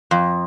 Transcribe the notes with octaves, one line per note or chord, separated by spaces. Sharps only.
F2